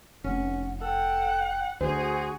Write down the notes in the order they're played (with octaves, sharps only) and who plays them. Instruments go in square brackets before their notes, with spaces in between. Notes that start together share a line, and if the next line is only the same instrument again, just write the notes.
[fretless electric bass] F1 [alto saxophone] C#4 [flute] F#5
[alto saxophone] A4 [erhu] F#5 [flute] G5
[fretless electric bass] D2 [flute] F#4 [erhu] G#4 [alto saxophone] C5